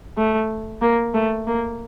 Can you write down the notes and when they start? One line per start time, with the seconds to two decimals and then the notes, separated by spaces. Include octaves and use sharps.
0.17 A3
0.82 A#3
1.14 A3
1.47 A#3